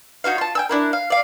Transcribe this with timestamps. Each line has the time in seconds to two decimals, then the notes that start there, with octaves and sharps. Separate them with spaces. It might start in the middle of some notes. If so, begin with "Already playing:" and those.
0.24 D#4 F#4 C#5 F5
0.38 F4 A5
0.55 G5 G#5 E6
0.69 D4 E4 A#4
0.93 F5
1.10 D5 F5